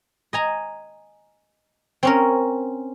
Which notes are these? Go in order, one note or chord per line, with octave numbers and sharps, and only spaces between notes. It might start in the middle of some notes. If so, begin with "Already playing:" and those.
D#5 G#5 A#5
C4 C#4 A#4